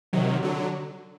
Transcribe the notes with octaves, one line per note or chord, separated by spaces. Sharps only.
C3 D#3 F#3
D3 F#3